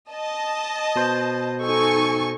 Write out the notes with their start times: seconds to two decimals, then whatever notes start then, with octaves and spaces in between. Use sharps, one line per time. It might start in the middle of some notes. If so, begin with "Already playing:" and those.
0.11 D#5 A5
0.96 B2 C5 G6
1.64 D#4 A4 G#5 C#6